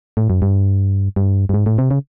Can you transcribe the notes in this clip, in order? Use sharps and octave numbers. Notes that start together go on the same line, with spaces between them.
A2
F#2
G2
G2
G2
G#2
A2
C3
C#3